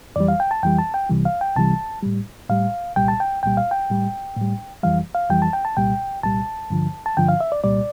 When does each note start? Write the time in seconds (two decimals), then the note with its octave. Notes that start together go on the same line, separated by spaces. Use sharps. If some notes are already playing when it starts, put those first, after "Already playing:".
0.16 F2 E3 G3 D5
0.28 F5
0.40 G5
0.51 A5
0.63 F2 E3 G3 G5
0.79 A5
0.94 G5
1.09 C2 C3 E3 G3
1.25 F5
1.41 G5
1.56 C2 C3 E3 G3 A5
2.03 A2 G3
2.49 A2 G3 F5
2.96 C2 A#2 G3 G5
3.08 A5
3.20 G5
3.43 C2 A#2 G3 G5
3.57 F5
3.71 G5
3.90 A2 G3
4.36 A2 G3
4.83 F2 E3 G3 F5
5.15 F5
5.30 F2 E3 G3 G5
5.42 A5
5.53 G5
5.65 A5
5.77 C2 A#2 G3 G5
6.23 C2 A#2 G3 A5
6.70 G2 D3 F3
7.06 A5
7.17 G2 D3 F3 G5
7.28 F5
7.41 E5
7.52 D5
7.64 C2 A#2 G3 D5